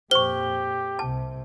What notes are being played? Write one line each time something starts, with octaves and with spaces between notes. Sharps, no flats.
F2 A#2 G4 C5 C#6 G7
C2 C3 A5